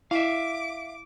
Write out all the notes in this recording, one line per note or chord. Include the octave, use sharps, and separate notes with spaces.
E4 E5 F5 D6